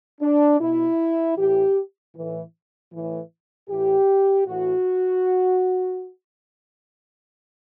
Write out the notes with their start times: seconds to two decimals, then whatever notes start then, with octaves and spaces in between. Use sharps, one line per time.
0.21 D4
0.60 B2 E4
1.37 A2 E3 G4
2.15 A2 E3
2.92 A2 E3
3.69 A2 E3 G4
4.47 A2 E3 F#4